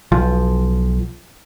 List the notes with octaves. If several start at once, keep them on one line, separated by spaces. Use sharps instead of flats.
B1 F3